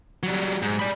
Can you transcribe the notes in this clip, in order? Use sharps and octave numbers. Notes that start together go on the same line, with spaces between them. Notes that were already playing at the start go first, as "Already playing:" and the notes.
F#3 G3
G#2
D5 B5